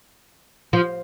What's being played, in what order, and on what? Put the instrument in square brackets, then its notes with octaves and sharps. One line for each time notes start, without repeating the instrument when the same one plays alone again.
[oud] F3